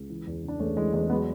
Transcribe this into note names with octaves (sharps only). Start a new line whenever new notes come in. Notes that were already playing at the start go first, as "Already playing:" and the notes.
Already playing: C#2
E3
E2
C#3 D4
E2 A3 C#4
E3 G#3
E2 G#3
F#3 G#3 B3